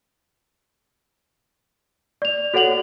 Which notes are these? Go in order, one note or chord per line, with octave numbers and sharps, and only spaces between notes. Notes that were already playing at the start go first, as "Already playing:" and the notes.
D5 F7
F#4 A4 C#5 F#5 F7 F#7